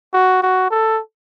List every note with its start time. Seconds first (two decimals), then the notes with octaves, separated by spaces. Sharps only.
0.13 F#4
0.43 F#4
0.70 A4